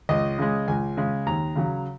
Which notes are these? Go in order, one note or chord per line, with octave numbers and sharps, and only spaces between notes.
C#2 D#5
C#3 G#3
C#2 G#5
C#3 G#3
D#2 A#5
C#3 F#3